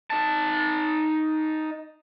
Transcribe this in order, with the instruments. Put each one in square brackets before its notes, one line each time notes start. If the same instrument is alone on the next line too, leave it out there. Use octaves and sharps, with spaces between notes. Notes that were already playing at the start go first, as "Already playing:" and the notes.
[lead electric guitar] D#4 A5